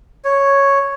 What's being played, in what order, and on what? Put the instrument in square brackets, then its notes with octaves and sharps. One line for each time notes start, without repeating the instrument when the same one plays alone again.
[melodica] C#5